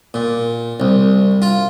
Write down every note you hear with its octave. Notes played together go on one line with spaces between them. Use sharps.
A#2
C2
F4